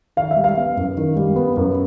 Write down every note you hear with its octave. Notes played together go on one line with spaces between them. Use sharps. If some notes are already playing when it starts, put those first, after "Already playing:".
D#3 F5
E5
G3
F5
B3
F#2
D#3
G3
B3
F#2